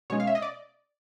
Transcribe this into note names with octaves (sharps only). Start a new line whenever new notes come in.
B2 G#3 C#4 C#5
F5
E5
D#5
D5